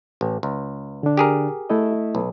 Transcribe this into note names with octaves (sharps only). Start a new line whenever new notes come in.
A1
C#2
D3 D4
G4 G#4 A#4
A3 E4 D#5
B1